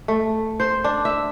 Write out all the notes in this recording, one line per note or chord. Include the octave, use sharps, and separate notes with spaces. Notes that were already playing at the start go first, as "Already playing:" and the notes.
A3
C5
D4
E5